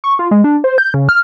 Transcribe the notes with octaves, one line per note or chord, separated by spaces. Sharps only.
C#6
F4
G#3
D4
C5
G6
C#3
F6